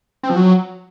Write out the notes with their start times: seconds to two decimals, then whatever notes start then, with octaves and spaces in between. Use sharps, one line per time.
0.23 C4
0.30 F3
0.36 F#3